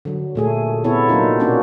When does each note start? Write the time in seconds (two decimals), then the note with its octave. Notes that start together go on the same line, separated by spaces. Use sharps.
0.05 D3 F#3
0.35 A#2 A3 G#4
0.84 C3 B3 E4 A4 C#5
1.09 F#3 A#3 D4 D#4 F4
1.40 B2 A#3 C#4 D4 F#4 G4